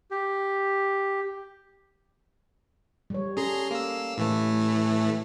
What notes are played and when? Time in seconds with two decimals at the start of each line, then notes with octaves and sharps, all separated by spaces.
0.11 G4
3.10 G3 C#5
3.37 C#4 G#4 A4 A#5 C6
3.71 A#3 E6
4.18 A2 E3 A3